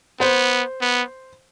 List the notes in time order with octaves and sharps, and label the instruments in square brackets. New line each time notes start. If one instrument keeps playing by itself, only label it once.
[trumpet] B3 [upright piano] C5
[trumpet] B3